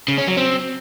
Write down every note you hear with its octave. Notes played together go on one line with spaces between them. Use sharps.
C#3
C#4
F#3
C4